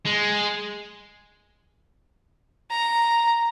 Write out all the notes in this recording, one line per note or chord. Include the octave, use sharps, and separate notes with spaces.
G#3
A#5